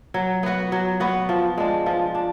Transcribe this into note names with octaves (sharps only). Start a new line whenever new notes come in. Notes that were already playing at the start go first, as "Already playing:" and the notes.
F#3
B3 F#4 B4
F#3
B3 F#4 B4
F3
G#3 D4
F3
D4